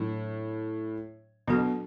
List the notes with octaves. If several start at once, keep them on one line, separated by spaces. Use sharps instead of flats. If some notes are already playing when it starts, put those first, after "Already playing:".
Already playing: A2 F#3 D4
B2 F#3 D4 F#4 A4